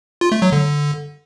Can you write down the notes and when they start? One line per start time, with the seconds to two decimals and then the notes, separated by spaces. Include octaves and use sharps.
0.21 F4
0.32 A3
0.42 F#3
0.52 D3